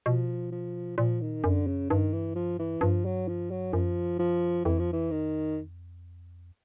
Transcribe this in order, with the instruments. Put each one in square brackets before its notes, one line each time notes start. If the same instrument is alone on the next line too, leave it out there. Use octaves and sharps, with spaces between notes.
[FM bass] B2 [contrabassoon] F3
[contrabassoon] F3
[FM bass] A#2 [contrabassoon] F3
[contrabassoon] D#3
[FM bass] F#2 [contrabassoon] D3
[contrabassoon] C#3
[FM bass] G2 [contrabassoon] D#3
[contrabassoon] E3
F3
E3
[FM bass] G2 [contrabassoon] F3
[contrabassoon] F#3
F3
F#3
[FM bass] F#2 [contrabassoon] F3
[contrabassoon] F3
[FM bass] F2 [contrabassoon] E3
[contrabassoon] F3
E3
D#3